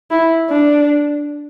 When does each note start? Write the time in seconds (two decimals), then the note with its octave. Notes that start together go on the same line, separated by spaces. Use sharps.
0.11 E4
0.50 D4